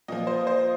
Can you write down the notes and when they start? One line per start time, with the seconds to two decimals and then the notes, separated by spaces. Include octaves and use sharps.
0.08 A#2 F3 D#5
0.27 C5
0.47 C5